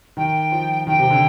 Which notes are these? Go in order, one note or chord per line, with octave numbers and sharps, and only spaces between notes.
D#3 G5
F3
D#3 G5
C3
D3